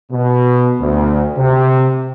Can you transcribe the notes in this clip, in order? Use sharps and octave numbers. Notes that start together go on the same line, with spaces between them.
B2
D2
C3